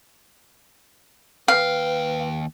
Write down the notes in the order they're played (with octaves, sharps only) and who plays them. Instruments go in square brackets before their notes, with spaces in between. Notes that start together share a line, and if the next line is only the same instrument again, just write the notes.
[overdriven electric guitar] D#2 G5 [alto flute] B4 [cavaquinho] F5